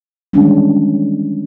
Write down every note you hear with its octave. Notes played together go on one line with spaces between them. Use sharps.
D#3 E3 G3 G#3 C#4 D4